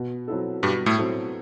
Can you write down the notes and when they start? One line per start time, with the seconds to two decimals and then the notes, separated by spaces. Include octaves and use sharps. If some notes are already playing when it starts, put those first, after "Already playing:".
Already playing: B2
0.28 F#3 C4 E4 A4
0.63 G2 B2 G3
0.86 A2 A3
0.98 F#3 C4 E4 A4